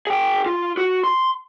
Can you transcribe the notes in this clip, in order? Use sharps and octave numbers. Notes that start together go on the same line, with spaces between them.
G#4 G5
F4
F#4
C6